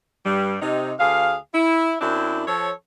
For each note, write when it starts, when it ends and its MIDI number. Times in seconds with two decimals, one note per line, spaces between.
0.25 0.56 43
0.25 0.56 55
0.62 0.92 48
0.62 0.92 63
0.99 1.35 38
0.99 1.35 68
0.99 1.35 77
1.53 1.96 64
2.01 2.42 42
2.01 2.42 60
2.01 2.42 62
2.01 2.42 64
2.47 2.70 53
2.47 2.70 69
2.47 2.70 73